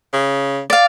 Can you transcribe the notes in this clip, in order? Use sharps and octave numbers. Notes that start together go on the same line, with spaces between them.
C#3
D5 F5